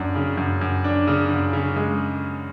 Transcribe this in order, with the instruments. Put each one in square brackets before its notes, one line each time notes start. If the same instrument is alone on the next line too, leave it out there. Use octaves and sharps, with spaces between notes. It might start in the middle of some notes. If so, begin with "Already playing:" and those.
Already playing: [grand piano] F#2 D4
C#3
F#2
F#2
D4
C#3
F#2
C#3
G#3